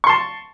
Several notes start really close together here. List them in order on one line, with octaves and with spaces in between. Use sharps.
C#6 C6 A5